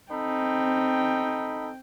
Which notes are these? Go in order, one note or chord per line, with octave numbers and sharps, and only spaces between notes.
C4 D#4 A4 G5 B5